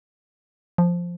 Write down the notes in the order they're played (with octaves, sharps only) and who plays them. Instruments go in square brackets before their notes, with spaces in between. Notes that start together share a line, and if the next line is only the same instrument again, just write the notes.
[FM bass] F3